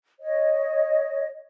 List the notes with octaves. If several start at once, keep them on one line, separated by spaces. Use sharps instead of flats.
C#5 D#5